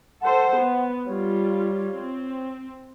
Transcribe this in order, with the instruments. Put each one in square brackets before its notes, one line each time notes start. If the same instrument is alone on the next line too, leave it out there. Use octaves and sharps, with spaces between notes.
[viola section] A4 C5 [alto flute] F#5
[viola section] B3
[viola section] G3 F4 [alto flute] C#5
[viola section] C4